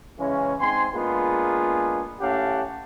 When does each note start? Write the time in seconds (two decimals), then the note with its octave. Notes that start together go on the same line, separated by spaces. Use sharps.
0.19 C#3 E3 G#3 C#4
0.60 G#2 C4 G#5 C6
0.94 G#3 A#3 B3 D4 F4 G#4
2.21 A2 C#4 G4 F5 F#5 A5